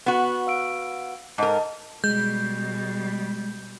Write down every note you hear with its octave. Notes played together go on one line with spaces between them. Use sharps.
B3 F#4
F5 E6 D7
G#2 A#4 D#5 A5
B2 G3 G#3 G6